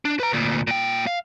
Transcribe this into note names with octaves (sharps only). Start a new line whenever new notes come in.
D4
B4 A#5
D2 A#2
A#2 G5
F5